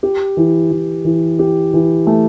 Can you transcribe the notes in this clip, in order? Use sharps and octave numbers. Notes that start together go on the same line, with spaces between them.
G4
E3
E3
E3
G4
E3
A3